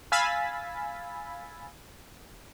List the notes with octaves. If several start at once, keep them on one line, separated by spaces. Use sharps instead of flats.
F5 G#5 B5 E6 A6 B6